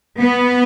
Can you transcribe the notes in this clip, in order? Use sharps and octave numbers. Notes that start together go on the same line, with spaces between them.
B3